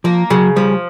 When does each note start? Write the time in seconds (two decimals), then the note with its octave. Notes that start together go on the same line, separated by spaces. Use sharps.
0.04 F3 A#3
0.30 C#3 F#3
0.56 F3 G3